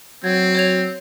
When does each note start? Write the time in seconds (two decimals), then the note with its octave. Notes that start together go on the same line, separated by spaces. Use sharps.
0.24 F#3 C4 G#6
0.55 C#5 G#6 F7